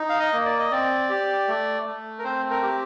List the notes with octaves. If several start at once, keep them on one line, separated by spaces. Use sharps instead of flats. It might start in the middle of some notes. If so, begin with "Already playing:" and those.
Already playing: D#4
F5
D#5
A#3
D5
D#5
C4 D5
G4
A3
A3
A#4
C4 C5
A#4
G4